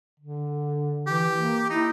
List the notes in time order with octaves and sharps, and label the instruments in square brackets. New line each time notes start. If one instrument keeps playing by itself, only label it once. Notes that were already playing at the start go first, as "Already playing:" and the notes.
[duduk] D3
[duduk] E3 [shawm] G4
[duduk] A#3
[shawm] D#4 [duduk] E4